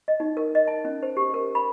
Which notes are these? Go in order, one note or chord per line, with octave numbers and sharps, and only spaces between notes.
D#5
D#4
A#4
D#5
A5
C#4
C5
G4
A#4
B5